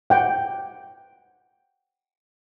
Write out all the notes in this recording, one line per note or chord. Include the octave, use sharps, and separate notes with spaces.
F#5 G5